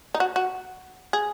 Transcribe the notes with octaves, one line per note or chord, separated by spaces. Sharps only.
D#4
F#4
F#4
G#4